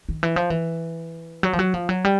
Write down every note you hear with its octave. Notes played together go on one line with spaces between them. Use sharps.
D#3
E3
F3
E3
F#3
F3
F#3
F3
F#3
G3